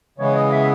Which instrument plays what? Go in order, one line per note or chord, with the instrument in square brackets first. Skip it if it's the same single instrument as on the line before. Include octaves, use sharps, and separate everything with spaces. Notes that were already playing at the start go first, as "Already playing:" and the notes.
[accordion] C#3 E3 G#3 B3 [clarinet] C#5
[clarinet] D#5
E5